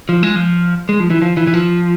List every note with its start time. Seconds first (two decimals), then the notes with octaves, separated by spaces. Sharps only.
0.09 F3
0.23 G#3
0.35 F3
0.89 G#3
1.00 F3
1.10 E3
1.22 F3
1.37 E3
1.47 E3
1.54 F3